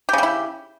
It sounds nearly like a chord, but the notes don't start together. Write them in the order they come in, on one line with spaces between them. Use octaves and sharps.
G4 C#3 G3 E4